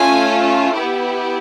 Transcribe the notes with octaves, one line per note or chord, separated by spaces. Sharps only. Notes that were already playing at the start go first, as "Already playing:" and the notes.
Already playing: A3 C#4 F4 G#5
B3 E4 G4